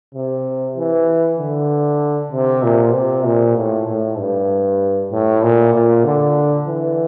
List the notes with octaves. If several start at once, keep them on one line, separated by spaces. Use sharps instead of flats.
C3
E3
D3
C3
A#2
C3
A#2
A2
A2
G2
A2
A#2
A#2
D3
E3